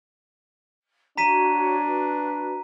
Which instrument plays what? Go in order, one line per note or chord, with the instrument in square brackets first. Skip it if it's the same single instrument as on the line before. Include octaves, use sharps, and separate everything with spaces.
[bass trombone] D4 [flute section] F#4 C#5 [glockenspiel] A#5 B6 D#7
[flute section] F#4 B4